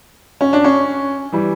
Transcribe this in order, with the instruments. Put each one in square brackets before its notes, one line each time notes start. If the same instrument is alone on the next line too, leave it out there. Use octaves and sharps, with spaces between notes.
[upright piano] C#4
D4
C#4
E3 G3